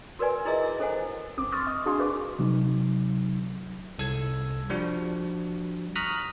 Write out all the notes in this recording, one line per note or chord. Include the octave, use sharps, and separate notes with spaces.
F#4 A#4 B4 D5 G#5
E4 F4 G#4 A#4 D#5 E5
E4
C#4 A4 C5 F#5 G#5
G1 C4 D6
C6 C#6 D#6 F6 A6
D#5
D4 F#4 G#4 F5 G#5 C6
A#4 B4 D5 C#6 D6
C3 F#3 D#4
C2 A4 E6 G#6
F3 G3 D4 F#4
A#5 C#6 D#6 F6 F#6 B6